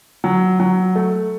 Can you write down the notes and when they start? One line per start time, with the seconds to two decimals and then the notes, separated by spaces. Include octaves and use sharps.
0.24 F#3
0.60 F#3
0.95 A3